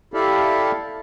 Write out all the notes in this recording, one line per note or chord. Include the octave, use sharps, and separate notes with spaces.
E4 G4 A4 D5 E5 F5